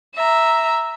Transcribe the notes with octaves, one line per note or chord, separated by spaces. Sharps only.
E5 A#5